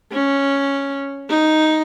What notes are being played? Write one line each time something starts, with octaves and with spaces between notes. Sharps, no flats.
C#4
D#4